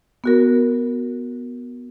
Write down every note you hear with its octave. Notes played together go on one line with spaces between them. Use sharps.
B3 F#4 A#4